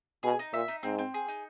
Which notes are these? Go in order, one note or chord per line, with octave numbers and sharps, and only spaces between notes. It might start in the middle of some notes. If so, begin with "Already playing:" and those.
B2 G#4
D#4
A#2 E5
D#4
G#2 C4
C4
G#4
D#4